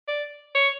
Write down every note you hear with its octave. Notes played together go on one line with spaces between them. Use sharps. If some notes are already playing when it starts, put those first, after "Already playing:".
D5
C#5